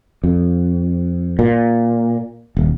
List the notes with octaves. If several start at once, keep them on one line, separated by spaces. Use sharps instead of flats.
F2
A#2
D#1